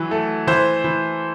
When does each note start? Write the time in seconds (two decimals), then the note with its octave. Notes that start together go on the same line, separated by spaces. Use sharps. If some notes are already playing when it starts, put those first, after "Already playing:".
Already playing: E3 F#3
0.11 A3
0.47 E3 C5
0.84 E3